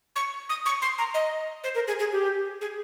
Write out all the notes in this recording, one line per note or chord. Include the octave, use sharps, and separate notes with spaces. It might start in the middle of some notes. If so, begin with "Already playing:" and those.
C#6
D#6
C#6
C6
A#5
D#5
C5
A#4
G#4
G#4
G4
G#4